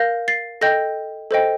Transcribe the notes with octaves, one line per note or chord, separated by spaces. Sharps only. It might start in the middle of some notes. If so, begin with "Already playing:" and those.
Already playing: A#4 F5 G6 A#6
A6 C7
A4 D#5 G5 G6 A#6
A4 C5 D#5 G5